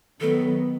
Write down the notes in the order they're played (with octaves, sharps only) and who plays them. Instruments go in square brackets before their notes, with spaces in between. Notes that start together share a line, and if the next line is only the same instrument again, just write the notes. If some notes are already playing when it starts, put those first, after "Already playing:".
[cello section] D#3 F#3 B3 [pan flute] A4